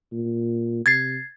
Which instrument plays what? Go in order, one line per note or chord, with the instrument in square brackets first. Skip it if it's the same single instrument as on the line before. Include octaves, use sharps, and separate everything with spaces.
[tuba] A#2
[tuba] C3 [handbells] G#6 A6 C7